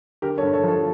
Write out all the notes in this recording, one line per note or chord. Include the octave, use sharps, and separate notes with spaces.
D3 G4 A#4
A4 C#5
G2
A4 C#5
F3 A4 C#5